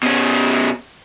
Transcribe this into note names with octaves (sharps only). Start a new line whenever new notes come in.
B2 C#4